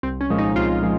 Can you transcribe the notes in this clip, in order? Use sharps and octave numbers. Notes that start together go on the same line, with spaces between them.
C2 C4
C#4
A#2 F3 G#3
D#4
C2 F4
A#2 F3 G#3